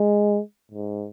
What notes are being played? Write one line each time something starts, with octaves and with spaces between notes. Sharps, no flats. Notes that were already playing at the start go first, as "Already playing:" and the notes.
Already playing: G#3
G#2